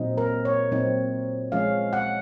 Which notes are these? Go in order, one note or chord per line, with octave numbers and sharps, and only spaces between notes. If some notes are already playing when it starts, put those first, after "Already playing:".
Already playing: A#2 F#3 C4 D#4
A#4
C#5
A#2 F#3 C4 D#4
F3 G#3 C#4 F5
F#5